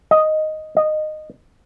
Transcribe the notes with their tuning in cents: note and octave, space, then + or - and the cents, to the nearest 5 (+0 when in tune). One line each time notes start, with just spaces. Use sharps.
D#5 +0
D#5 -15